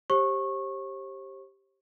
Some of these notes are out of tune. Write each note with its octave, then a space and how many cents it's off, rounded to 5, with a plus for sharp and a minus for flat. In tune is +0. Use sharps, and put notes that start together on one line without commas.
G4 +0 C5 +40 C#6 -20